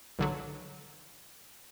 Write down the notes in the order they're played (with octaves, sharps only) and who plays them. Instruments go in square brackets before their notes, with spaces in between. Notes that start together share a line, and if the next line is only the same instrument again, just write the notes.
[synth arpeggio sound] B1 D3 F#3